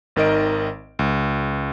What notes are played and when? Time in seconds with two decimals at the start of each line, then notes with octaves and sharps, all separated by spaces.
0.16 G#1 D#3 A#4 D#5 D7
0.99 C#2